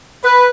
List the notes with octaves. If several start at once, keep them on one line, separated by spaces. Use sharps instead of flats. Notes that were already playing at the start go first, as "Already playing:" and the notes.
B4